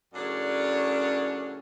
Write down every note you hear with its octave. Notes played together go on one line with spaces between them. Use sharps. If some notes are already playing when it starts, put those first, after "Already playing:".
F#2 A2 C#3 D4 C#5 D5